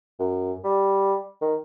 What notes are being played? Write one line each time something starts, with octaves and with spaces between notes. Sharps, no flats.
F#2
G3
D#3